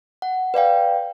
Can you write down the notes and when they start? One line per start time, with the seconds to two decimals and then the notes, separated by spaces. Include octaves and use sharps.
0.22 F#5
0.54 B4 D5 F5 G5